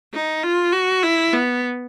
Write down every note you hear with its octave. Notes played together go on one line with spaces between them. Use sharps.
D#4
F4
F#4
E4
B3